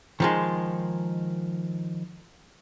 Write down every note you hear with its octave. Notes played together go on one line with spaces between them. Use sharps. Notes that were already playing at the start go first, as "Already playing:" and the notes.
D#3 F3 G#3